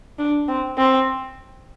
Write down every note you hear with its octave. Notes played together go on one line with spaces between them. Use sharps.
D4
C4
C4